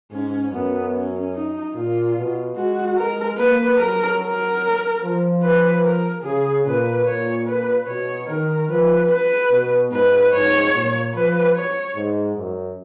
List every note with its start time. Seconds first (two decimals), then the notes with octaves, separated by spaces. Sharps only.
0.11 G#2 C#4
0.52 F#2 B3
0.94 C#4
1.34 D#4
1.75 A#2 F4
2.16 B2
2.56 G#3 F#4
2.97 G#3 A#4
3.38 A#3 B4
3.79 F#3 A#4
4.20 A#4
5.02 F3
5.42 B4
5.84 A#4
6.24 C#3 G#4
6.65 A#2 B4
7.05 A#2 C#5
7.46 B4
7.87 B2 C#5
8.28 D#3 A#4
8.69 F3 B4
9.10 B4
9.51 B2
9.92 G#2 B4
10.32 G#2 C#5
10.73 A#2
11.14 F3 B4
11.56 C#5
11.96 G#2
12.36 F#2